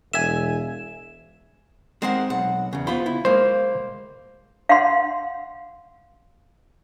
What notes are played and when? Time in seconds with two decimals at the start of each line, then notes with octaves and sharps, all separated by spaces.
0.13 E1 E5 G#5 E7
2.02 G#3 C4 A#4 C5 F#5
2.30 B1 F#5
2.73 E2 C#3
2.87 B3 F4 C5 B5
3.06 E4
3.25 G#3 A#3 C5
4.69 F5 F#5 C6